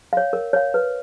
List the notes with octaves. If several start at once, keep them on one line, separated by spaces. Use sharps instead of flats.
C#5 F5
A#4
C#5 F5
B4